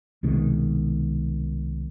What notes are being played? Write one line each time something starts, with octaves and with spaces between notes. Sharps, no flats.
C2 B2 D#3 G#3